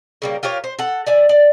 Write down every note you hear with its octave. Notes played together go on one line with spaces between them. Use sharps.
C#3 G3 A#3
F4 G4 A#4 C#5
C5
A4 F#5
D5 E5 G#5
D5